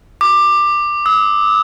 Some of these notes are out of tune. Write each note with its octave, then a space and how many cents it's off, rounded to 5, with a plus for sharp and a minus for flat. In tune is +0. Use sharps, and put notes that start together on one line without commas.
D6 +15
E6 -40